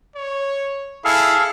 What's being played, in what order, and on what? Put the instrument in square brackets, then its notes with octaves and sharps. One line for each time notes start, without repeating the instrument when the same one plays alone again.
[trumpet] C#5
[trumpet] E4 [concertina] G#4 A4 F5